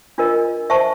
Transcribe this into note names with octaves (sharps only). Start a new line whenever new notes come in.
D4 F4 A#4 D#5
C5 E5 A5 C#6